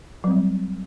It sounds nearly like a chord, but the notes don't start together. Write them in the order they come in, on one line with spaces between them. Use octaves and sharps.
F#3 C4 G3